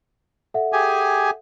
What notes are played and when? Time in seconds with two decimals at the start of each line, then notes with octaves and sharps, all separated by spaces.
0.54 A4 E5 F#5
0.73 G4 G#4 G#5